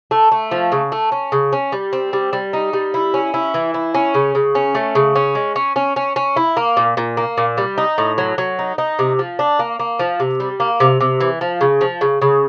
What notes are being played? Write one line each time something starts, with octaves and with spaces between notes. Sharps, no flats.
A3
A3
F3
C#3
A3
C#4
C#3
C#4
G3
C4
G3
G3
D#4
G3
E4
C#4
E4
E3
E4
C#4
C#3
C#3
C#4
A3
C#3
C#4
G#3
C#4
C#4
C#4
C#4
E4
A#3
A#2
A#2
A#3
A#2
G3
D#4
A2
F#3
F#3
D#4
D#4
C3
F3
D4
A#3
A#3
F3
C3
G3
A#3
C3
C3
E3
F3
C#3
F3
C#3
C#3